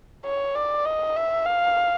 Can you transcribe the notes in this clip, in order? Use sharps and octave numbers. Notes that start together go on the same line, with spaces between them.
C#5
D5
D#5
E5
F5